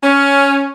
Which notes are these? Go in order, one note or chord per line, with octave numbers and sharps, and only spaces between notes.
C#4